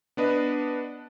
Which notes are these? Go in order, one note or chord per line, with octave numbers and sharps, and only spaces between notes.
B3 D4 B4 D#5